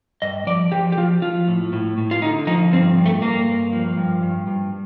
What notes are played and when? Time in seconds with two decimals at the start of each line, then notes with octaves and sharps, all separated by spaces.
0.22 G2 D#5
0.47 F3 D5
0.72 F3 G4
0.92 G4
0.97 F3 F4
1.22 F3 F4
1.48 A2
1.73 A2
1.98 A2
2.11 F4
2.22 D3 D#4
2.47 F3 D#4
2.73 G2 C4
2.97 G2
3.06 A3
3.22 G2 A#3
3.48 G2
3.73 F3
3.98 G2
4.22 G2
4.47 G2